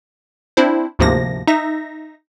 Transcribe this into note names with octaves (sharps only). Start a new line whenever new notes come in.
C4 D4 E4 C5
D2 G#2 C3 F3 A#3 A#6
D#4 E5 A#6